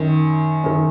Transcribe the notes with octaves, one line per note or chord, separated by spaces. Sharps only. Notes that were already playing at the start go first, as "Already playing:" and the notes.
Already playing: F#2 D#3
F#2 D#3